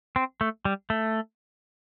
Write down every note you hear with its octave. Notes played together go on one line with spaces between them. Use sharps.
C4
A3
G3
A3